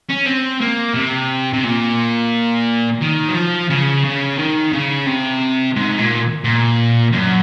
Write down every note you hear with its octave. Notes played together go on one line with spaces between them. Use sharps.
C#4
C4
A#3
C3
C3
A#2
D#3
F#3
F3
C#3
C#3
D#3
C#3
C3
G#2
A#2
A#2
F#2